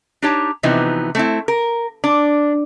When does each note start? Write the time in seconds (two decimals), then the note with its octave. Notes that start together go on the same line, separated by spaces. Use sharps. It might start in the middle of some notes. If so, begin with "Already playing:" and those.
0.22 D4 D#4 G4 C#5 A5
0.63 C3 E3 F3 B3 D#4
1.15 A3 C4 E4
1.48 A#4
2.04 D4